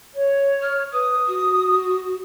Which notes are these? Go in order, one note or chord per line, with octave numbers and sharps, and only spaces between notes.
C#5
F6
B4 D#6
F#4